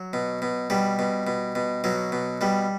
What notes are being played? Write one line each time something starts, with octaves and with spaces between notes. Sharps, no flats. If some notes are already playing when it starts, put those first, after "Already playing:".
Already playing: F#3
B2
B2
B2 G3
B2
B2
B2
B2 F#3
B2
B2 G3